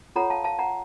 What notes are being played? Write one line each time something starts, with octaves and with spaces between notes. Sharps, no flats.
F4 A4 C#5 F#5 A#5
F5 A5
F5 A5
F#5 A#5